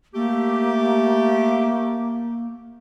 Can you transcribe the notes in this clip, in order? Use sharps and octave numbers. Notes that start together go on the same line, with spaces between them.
A3 A#3 G4